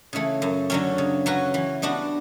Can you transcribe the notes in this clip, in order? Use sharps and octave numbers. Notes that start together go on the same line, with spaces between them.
C#3 E3 A3
F#2
D3 F#3 C#4
C#3
F#3 C#4 F#4 B4
E3
G3 B3 D4 F#4